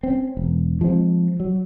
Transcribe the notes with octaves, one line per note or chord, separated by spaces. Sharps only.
C4 C#4
E1
F3 G#3 C4
F#3